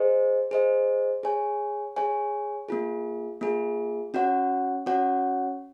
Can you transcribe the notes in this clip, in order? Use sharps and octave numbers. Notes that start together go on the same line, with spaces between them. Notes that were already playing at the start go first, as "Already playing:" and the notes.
Already playing: G#4 C5 D#5
G#4 C5 D#5
G#4 C#5 G#5
G#4 C#5 G#5
A#3 F4 G#4
A#3 F4 G#4
C#4 F#4 C#5 F#5
C#4 F#4 C#5 F#5